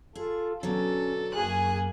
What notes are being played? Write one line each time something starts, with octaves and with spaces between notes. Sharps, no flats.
F4 G#4 A4
B2 D3 F#3 C#4 A4
F#2 A#3 G#4 G#5 F#6